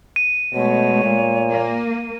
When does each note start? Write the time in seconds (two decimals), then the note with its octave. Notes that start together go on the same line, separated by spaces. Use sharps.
0.16 D#7
0.54 B2 G#3 A3 C#5
1.04 A#2
1.51 A#3